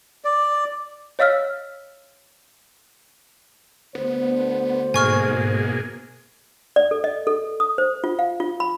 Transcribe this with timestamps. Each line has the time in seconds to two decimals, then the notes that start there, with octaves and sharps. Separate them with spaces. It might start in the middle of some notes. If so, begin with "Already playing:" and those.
0.25 D5
1.19 C#5 D#5 F5 E6 F6 B6
3.95 D2 D3 B3 C5
4.94 G#2 B2 A#3 G#4 G#5 C#6 F6
6.76 D5
6.91 A4
7.04 D#5
7.27 A4
7.60 D#6
7.78 C5
8.04 F4
8.19 F5
8.40 F4
8.60 B5